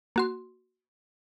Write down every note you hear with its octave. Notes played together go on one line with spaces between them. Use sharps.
A#3 F#4 C6